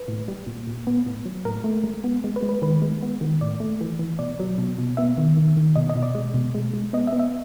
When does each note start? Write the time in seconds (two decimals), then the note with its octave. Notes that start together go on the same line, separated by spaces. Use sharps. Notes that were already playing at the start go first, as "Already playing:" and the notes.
Already playing: B4
0.08 A2
0.28 G3
0.47 A#2
0.67 A#2
0.87 B3
1.06 A2
1.26 F#3
1.45 A2 A#4
1.64 A3
1.84 G#3
2.04 B3
2.24 G#3
2.36 B4
2.42 G#3
2.49 B4
2.62 D#3 B4
2.82 G#3
3.02 B3
3.21 D#3
3.41 A2 D5
3.60 A3
3.81 E3
3.99 E3
4.19 B2 D5
4.40 F#3
4.58 B2
4.78 B2
4.97 B3 E5
5.18 D#3
5.37 D#3
5.57 D#3
5.76 B2 D#5
5.89 D#5
5.96 B2
6.03 D5
6.15 G#3
6.34 B2
6.55 G#3
6.74 G#3
6.93 B3 D#5
7.07 E5
7.13 B3
7.19 E5